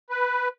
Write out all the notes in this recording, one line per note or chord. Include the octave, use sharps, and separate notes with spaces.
B4